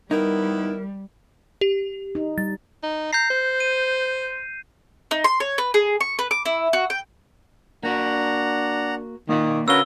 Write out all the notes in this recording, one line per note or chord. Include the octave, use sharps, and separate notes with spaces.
D#3 G3 B3 D#4 E4 A#4
G4
D#4
G3 A6
D#4
A#5 G6 C7
C5
D#7
D#4
C6
C#5
B4
G#4
C#6
B4
D6
E4
F#4
G5
A#3 D4 F#4 F#5 A#5
D#3 A#3 D5 F5
D3 C#4 F#4 A#4 B4 F5 E6 G7